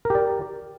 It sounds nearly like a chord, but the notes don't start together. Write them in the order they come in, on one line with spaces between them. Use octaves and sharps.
A#4 G4 D5